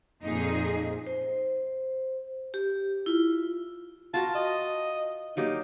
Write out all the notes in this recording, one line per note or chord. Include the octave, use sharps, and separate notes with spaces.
F2 A#2 D#4 G#4
C5
G4
E4 F4
F4 F#4 A#4 A5
D#5
F#3 A#3 D#4 G4